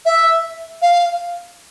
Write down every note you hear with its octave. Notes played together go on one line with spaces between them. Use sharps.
E5
F5